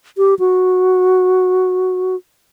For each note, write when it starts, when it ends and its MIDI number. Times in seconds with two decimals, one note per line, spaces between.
0.18 0.34 67
0.39 2.16 66